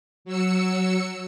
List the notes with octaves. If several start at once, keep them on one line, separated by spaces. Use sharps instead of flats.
F#3 E6 C#7